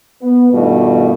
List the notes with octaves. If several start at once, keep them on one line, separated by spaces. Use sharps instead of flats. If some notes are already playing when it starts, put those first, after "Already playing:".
B3
G2 B2 D#3 A3 F4